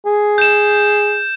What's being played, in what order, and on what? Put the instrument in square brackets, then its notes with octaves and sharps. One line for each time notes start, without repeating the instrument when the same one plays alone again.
[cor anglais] G#4
[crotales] G6 E7